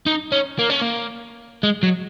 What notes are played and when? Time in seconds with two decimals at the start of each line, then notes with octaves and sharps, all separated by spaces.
0.06 D#4
0.32 C#4
0.59 A#3
0.70 C#4
0.81 A#3
1.63 G#3
1.83 F#3